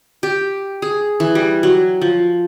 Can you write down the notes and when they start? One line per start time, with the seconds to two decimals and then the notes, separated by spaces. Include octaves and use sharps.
0.23 G4
0.82 G#4
1.20 E3
1.35 G3
1.63 F#3
2.02 F3